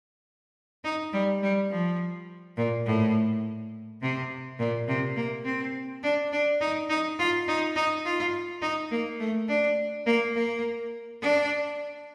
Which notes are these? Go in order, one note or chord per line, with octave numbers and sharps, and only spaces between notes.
D#4
G3
G3
F3
A#2
A2
C3
A#2
C3
A#3
C4
D4
D4
D#4
D#4
F4
D#4
D#4
F4
D#4
A#3
A3
D4
A#3
A#3
D4